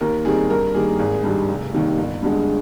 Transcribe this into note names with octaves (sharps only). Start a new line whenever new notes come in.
D#2 A#4
D#3 G3 C4 G#4
G2 A#4
D#3 G3 A#3 G#4
G#1 G#4
G2 D#3 G3
F1
D#2 D#3 G3
G1
G2 D3 G#3